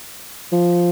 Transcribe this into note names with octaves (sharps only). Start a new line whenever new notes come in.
F3